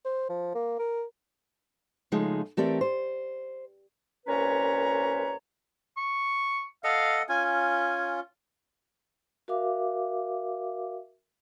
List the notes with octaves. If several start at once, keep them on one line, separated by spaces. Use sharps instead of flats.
C5
F3
A#3
A#4
C#3 F3 G#3 A3 D#4 G#4
E3 A3 C4 G4 A#4 D5
C5
C2 A#2 C#4 B4 C#5 A#5
C#6
A4 D#5 F5 F#5
C#4 F4 G#5
G#5
F#4 A#4 E5 F5 D6